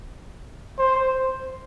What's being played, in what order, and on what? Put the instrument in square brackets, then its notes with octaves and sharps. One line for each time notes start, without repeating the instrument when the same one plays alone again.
[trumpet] C5